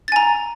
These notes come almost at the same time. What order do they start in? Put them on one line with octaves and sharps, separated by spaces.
A6 G#5 A#5